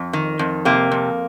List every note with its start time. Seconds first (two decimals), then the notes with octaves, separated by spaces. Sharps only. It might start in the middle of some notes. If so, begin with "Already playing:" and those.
Already playing: F2
0.13 D#3
0.39 F2
0.65 C3 A#3
0.92 F2